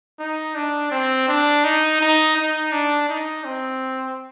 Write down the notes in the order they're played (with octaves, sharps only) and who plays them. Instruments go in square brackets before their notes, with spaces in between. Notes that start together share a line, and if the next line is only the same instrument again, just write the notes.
[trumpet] D#4
D4
C4
D4
D#4
D#4
D#4
D4
D#4
C4